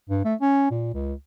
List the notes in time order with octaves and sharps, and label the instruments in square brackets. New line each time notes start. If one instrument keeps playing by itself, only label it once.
[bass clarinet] G2
A3
C#4
A#2
C#2